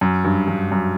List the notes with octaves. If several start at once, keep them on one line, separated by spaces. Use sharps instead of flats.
F#2
G2
G2
F#2